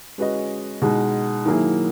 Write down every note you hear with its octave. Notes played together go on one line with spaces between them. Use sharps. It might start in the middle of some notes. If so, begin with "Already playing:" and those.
G#3 C#4 F#4 B4 D#5
B2 G#3 D#4
D#3 F#3 A#3 E4 G#4